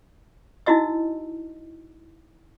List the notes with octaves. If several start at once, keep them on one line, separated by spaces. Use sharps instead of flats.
D#4 E4 F#4 D#5 E6